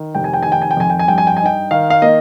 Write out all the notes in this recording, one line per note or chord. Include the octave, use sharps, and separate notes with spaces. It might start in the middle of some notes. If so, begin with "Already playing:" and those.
Already playing: D#3
F1 G5
G#5
G5
D#3 G#5
G5
G#5
G5
F2 G#5
G5
G#5
G2 G5
G#5
G5
D#4 G#5
G5
D#3 F5
F5
A#3 D#5